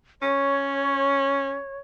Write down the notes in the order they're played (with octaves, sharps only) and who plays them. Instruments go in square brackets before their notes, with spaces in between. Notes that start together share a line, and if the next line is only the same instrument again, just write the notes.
[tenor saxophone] C#4 [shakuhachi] C#5